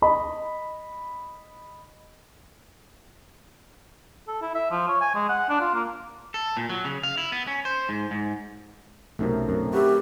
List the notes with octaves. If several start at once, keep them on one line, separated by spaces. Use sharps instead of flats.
D#5 B5
A4
E4
E5
F3
C#5
G#5
G#3
F#5
D4
F4
A#3
A4
A#2
F#3
C#3
F5
E4
B3
C#4
C5
G#2
G#2
B1 F#2 C3 A3 D#4 A#4
F#2 B2 A3 C4
F#4 G4 B4 E5